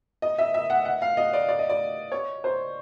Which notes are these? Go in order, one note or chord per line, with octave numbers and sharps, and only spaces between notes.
D#5
E5
E5
F#5
F#5
F5
D#5
D5
D5
D#5
D5
C#5
C5